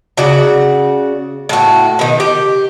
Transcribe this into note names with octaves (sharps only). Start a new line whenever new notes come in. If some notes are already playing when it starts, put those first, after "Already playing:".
C#3 F#4 D5
A2 F#4
B2 D#3
G4